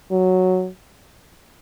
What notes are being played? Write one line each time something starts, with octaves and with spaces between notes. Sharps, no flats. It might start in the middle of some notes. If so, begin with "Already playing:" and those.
F#3